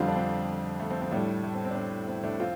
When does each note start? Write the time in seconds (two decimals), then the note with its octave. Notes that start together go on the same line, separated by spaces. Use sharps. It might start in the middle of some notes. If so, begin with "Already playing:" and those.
Already playing: F2 D3 G3 C4 F4
0.08 D4
0.16 C4
0.80 A3
0.91 C4
1.01 C4
1.11 A2 G3 A3 D4
1.44 A3
1.54 C4
1.65 C4
1.70 D4
1.75 C4
2.08 C4
2.24 A3 D4
2.40 F3 C4 F4